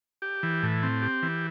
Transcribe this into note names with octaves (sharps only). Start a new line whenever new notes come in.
G4
E3
A2
C4
G4
E3